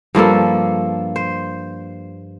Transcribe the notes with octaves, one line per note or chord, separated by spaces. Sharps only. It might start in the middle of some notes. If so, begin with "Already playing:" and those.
G2 F3 A#3 A4
C5